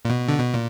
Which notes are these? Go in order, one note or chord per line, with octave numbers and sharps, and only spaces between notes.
A#2
B2
D3
B2
A#2